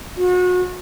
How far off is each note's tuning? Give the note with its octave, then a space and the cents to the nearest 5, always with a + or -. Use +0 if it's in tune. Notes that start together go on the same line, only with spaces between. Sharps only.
F#4 -35